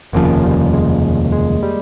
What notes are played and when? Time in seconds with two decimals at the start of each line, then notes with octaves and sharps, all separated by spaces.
0.13 F1 D#2 C#3 F3 A#3
0.43 G3
0.73 G#3
1.32 G#3
1.62 G3